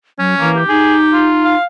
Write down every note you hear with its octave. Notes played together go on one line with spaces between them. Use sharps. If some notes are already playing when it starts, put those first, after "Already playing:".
F#3 C#4
E3 A#3
G4
D#4 G#4
F4
F5